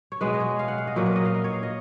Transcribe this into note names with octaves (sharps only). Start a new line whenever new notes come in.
C#5
B2 G#3 B3 B4
D#5
C#5
F5
F#5
F5
D#5
A#2 F#3 A#3 B4
B4
D#5
F5
A#4
C#5
F5
D#5